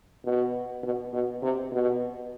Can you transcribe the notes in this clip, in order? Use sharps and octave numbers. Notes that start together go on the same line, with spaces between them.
B2
B2
B2
C3
B2